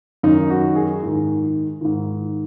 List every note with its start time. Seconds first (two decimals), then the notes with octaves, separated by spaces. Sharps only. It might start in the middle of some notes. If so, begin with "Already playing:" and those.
0.23 F#2 D#3 D#4
0.50 F#4
0.76 G#4
1.03 G#2 D#3
1.81 G#2 D#3